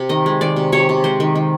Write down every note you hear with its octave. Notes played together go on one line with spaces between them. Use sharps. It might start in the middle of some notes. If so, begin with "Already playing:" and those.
Already playing: C3
D#3 D#5
G#3
D#3 D5
C3
C3 C#5
C3
G#3 C5
D#3
D#3